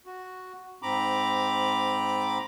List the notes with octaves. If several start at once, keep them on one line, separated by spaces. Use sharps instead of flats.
F#4
G#2 C4 A#5 B5 D6